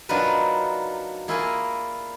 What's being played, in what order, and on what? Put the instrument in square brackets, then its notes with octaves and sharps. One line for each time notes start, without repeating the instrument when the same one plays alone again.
[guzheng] F#3 D4 D#4 F4 A#4 B4
A#3 E4 F4 G#4 A#4 G#5